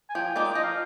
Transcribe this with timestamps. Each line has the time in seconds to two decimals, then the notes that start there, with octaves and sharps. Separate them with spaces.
0.10 G#5
0.15 F3 G5
0.36 G#3 D#4 A#4 D5
0.55 F3 D#5
0.63 F5